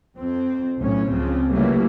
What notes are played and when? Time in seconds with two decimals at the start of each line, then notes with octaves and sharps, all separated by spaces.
0.17 F2 C4
0.78 B1 A2 C#4
1.10 C#2 C#3 F3 C4
1.52 C#3 E3 F#3 G3 A3 A#3